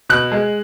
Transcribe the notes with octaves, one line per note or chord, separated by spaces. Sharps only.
B2 F#6
G#3